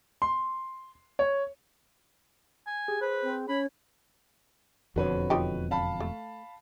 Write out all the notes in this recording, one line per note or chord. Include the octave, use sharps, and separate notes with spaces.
C6
C#5
G#5
G4 G#4
B4 C5
C4
C#4 C#5 B5
E1 F2 D3 F#4 B4 C#5
F3 D#4 G4
F5 A5 B5
A3